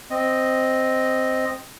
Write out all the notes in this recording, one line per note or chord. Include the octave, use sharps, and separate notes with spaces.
C4 D#5